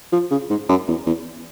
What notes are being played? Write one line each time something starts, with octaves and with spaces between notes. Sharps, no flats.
F3
C#3
G#2
F#2
E2
E2